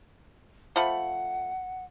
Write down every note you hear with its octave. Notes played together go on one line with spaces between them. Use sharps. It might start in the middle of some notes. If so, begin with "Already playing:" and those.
F3 A3 F#5 B5